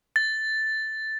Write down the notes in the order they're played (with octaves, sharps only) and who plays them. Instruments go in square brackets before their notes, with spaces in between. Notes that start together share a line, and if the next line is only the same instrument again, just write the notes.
[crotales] A6